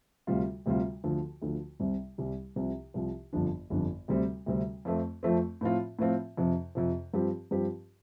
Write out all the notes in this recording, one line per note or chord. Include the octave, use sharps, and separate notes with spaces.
D2 C3 G3 F4
D2 C3 G3 F4
D2 D3 F3
D2 D3 F3
C2 C3 G3
C2 C3 G3
C2 C3 F3
C2 C3 F3
G1 F2 F3 D4
G1 F2 F3 D4
D2 C3 G3 C4
D2 C3 G3 C4
F2 F3 A3 C4
F2 F3 A3 C4
A2 F3 C4 F4
A2 F3 C4 F4
F2 C3 F3
F2 C3 F3
G2 F3 C4 G4
G2 F3 C4 G4